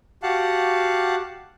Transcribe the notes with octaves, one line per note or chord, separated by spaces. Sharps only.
F#4 G4 F5 F#5 A5 F#6